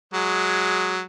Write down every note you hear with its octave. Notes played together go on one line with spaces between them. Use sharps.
F#3 G#3